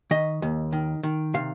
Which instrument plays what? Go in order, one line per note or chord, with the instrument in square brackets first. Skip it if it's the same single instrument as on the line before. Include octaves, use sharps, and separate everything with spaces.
[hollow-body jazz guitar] D#3 D#5
D#2
D#3
D#3
C3 F5